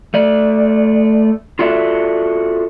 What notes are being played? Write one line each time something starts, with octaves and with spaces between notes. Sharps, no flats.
A3 D5
F4 F#4 A4 D5 E5